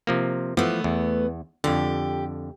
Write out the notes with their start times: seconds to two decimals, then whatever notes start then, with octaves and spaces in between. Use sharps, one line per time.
0.07 C3 F3 A#3
0.57 E3 F3 A3 B3
0.84 E2
1.64 F2 D3 G4